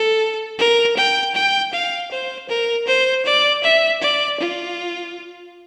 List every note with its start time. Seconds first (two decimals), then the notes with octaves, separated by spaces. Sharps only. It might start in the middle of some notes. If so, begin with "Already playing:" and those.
Already playing: A4
0.59 A#4
0.97 G5
1.35 G5
1.73 F5
2.11 C5
2.49 A#4
2.87 C5
3.26 D5
3.64 E5
4.02 D5
4.40 F4